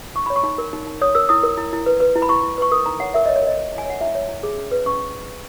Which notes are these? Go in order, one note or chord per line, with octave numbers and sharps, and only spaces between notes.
D#4 C#6
C#5 B5
C#6
D#4
A#4
D#4
D#4
C#5 D#6
A#4 E6
E4 D#6
A#4
E4
E4
B4
B4
E4
B5
E4 C#6
E4
B4 C#6
A#4 D#6
D#4 A#5
C#5 F#5
A#4 E5
C#5 D#5
C#5
A#4 D#5
A#4
E4
G#5
C#5 F#5
E4 E5
C#5
E4
G#4
C#4
B4
C#4 C#6